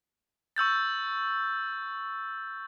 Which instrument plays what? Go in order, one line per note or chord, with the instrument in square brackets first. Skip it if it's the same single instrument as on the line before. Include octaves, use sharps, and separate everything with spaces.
[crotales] C#6 E6 G6 A6